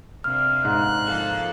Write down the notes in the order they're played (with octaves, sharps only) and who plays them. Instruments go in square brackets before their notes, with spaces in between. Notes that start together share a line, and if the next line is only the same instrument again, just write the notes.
[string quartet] C3 A#3 D4 [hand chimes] F6
[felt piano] G#2 [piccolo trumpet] F#6
[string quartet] F3 A#3 A4